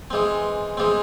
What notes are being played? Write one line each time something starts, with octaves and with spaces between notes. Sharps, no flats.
E3 G#3 C4
E3 G#3 C4